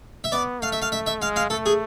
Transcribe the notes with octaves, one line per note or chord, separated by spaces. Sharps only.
E5
B3 D5
A3 F5
E5
F5
E5
E5
G#3 F5
F5
A3 A4
G#4